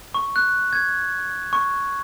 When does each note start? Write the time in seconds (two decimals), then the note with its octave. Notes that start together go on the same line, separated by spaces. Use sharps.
0.15 C#6
0.36 F#6
0.73 G#6
1.53 C#6